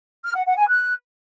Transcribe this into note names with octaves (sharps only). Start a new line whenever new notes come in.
F6
F#5
F#5
G#5
F#6